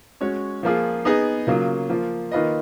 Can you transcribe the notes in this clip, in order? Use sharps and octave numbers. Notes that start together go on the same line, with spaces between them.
G#3 C#4 F#4 C#5
F3 A#3 F4 G#4
B3 D#4 G#4 D#5
C#3 F#3 A#3 F4
F3 A#3 F4
D#3 A#3 F4 B4 D#5